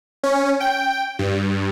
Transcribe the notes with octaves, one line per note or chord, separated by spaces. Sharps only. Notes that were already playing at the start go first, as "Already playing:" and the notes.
C#4
G5
G2